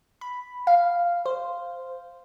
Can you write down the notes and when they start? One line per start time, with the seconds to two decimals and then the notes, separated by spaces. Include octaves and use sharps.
0.21 B5
0.67 F5
1.26 C5